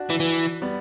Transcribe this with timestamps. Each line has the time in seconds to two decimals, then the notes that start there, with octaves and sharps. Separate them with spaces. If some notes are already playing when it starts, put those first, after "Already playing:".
Already playing: D4 F#4
0.10 E3
0.20 E3
0.62 G3 B3